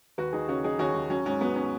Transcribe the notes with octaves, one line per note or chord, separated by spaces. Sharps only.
D#2 F#4 B4
D#2 D#4 G#4
C#3 C#4 F#4
F#3 D#4 G#4
D#2 C#4 F#4
D#2
F#3 C#4
G#2 C#4
F#3 B3
C#4